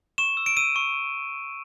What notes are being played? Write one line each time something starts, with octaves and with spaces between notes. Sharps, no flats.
C#6 E7
E6
D7
E6 D#7
C#6